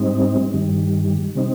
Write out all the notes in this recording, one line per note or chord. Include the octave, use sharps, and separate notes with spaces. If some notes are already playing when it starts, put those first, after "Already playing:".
Already playing: G#2 G3 C4 D#4
G2 D#3 G3
C3 G3 C4 D#4